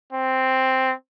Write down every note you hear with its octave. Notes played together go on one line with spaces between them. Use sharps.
C4